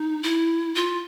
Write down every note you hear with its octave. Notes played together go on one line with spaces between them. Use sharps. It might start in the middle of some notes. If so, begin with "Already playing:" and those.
Already playing: D#4
E4
F4